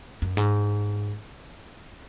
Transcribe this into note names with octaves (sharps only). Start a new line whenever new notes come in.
F#2
G#2